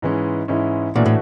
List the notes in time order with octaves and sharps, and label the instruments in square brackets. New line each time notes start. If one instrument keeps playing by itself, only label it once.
[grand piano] G#2 E3 G#3 C#4 E4
G#2 E3 G#3 C#4 E4
[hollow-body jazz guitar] A#2 [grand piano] E3 A3 D4 F#4
[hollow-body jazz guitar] A2